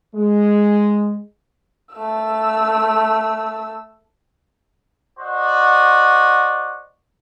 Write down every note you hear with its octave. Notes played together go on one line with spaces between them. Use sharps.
G#3
A3 E6
F#4 C5 D5 D#5